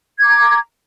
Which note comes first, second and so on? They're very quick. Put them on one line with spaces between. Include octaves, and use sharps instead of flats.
G#6 D6 A#5